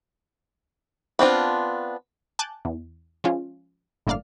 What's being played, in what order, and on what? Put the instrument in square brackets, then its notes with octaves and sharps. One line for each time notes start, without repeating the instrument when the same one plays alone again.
[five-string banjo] B3 C4 D4 F4
[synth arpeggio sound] G#5 A5 D6 F#6 G6 A6
E2
F3 G#3 C#4 F4
G1 A2 A#3 D5 F5 F6